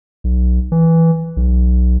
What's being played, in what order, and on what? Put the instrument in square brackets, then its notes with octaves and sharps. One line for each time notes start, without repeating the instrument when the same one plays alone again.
[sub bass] B1
E3
B1